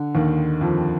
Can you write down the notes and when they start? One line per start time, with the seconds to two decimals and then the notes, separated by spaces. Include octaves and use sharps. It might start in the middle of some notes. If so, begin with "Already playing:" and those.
Already playing: D3
0.15 D#2 D#3
0.61 F2 F3